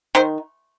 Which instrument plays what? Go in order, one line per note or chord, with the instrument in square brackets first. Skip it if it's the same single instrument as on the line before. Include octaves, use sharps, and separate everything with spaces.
[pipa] D#3 C5